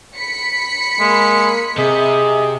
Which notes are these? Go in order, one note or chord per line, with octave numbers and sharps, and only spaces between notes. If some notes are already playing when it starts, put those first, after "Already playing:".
B5 B6 C#7
G#3 A#3
C3 G#4 D#5